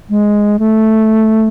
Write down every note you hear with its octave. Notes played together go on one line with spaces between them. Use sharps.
G#3
A3